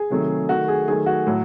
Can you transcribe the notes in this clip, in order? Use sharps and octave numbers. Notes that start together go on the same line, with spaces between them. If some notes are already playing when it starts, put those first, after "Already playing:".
Already playing: G#4
C3 D#3 F#3 A3
D#3 A3 F#4
G#4
D#3 F#3 A3 G#4
F#4
A2 F#3